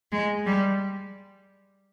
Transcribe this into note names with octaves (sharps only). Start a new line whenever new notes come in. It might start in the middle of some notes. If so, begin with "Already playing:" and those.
G#3
G3